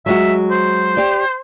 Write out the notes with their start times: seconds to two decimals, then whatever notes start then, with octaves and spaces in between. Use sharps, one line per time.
0.06 F#3 G#3 F#4 E5
0.51 C5
0.97 G4 D5